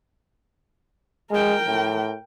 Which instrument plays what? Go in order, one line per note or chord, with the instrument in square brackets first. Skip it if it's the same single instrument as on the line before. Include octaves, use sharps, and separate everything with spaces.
[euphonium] G#3 [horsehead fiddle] A#4 G5
[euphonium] A2